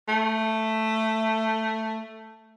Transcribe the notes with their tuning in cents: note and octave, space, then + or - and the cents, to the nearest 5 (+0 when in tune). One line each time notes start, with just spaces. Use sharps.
A3 +5